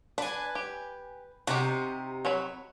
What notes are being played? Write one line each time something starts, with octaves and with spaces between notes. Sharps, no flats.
D4 B4 G#5
G4
C3 D#4 F#4 G4
F#3 C#5 B5